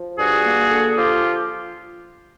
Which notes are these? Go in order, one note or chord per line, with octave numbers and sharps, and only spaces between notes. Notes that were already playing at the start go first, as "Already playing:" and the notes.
Already playing: F3
G2 F#4 G#4
A#3
D3
F3 F4 G4